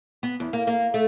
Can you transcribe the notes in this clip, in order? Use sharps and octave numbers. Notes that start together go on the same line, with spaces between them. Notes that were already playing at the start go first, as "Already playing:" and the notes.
B3
E2
A#3
A#3
A3